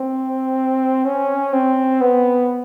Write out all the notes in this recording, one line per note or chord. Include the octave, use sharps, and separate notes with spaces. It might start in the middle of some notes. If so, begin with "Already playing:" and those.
Already playing: C4
C#4
C4
B3